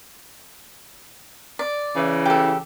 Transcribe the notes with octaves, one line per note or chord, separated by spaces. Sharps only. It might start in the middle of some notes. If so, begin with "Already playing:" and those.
D5
C#3 E3
G4 A4